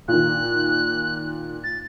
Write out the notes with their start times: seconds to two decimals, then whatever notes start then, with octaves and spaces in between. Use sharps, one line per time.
0.08 A#2 D#3 F#6
1.64 A6